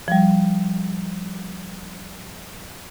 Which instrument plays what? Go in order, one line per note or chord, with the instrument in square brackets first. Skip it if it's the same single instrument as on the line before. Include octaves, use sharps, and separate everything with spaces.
[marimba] F3 G3